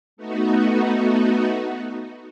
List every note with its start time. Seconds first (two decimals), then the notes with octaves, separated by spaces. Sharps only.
0.17 A3 B3 D#4 F#4